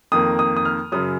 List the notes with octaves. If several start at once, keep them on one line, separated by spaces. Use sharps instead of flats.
F2 D#3 A#3 D#6
D#6
D#6
F6
F#2 C#3 F#3 D#6